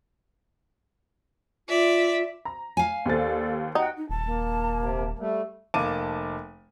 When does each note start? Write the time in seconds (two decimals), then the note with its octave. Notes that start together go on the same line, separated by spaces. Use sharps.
1.69 F4 D5 E5
2.45 A#5
2.77 F5 G#5
3.06 D#2 A4 C5 D5 A6
3.75 D#4 F#4 F#5 G5
3.97 D#4
4.09 D#1 A5
4.26 A#3
4.79 C3
5.19 G3 A3
5.74 F1 A#3 A5 D6 D#7